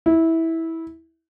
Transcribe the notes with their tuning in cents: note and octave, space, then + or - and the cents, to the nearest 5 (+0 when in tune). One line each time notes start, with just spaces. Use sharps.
E4 -15